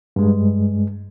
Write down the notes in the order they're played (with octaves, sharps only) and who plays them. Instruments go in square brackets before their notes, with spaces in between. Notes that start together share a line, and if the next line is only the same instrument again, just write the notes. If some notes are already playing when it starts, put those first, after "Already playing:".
[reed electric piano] G2 G#3